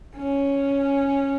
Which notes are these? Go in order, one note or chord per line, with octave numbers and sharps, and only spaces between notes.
C#4